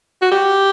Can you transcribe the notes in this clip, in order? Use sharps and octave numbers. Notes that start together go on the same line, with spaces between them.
F#4
G4